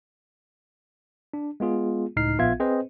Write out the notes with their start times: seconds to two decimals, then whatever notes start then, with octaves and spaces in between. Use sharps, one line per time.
1.34 D4
1.60 G#3 B3 F4 G#4
2.16 C#2 A2 D#4 F6 C7
2.39 A#1 B3 F4 E5 F5 G#6
2.60 C4 G#4 B4 C5 D#5